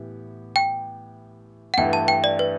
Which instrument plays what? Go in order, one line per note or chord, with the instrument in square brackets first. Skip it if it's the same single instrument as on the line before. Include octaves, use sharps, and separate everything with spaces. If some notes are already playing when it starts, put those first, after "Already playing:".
Already playing: [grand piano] A2 E3 B3 G4
[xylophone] G5
F#5
[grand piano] G2 E3 A3 [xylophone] G5
[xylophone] A5
G5
D5
B4